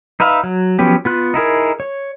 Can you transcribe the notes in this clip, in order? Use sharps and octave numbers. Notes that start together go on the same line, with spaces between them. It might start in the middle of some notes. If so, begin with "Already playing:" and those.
D#4 B4 E5 F5
F#3
F3 F#3 B3 C#4 G4
B3 F4 F#6
D#4 E4 G#4 A#4
C#5